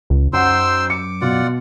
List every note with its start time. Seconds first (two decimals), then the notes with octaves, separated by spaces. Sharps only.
0.10 C#2
0.33 F#2 D#4 C5 F#5 G5 C6 E6
0.90 D6 C#7
1.21 B2 F4 D5 F#5